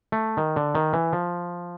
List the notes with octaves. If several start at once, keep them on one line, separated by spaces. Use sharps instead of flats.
A3
D#3
D3
D#3
E3
F3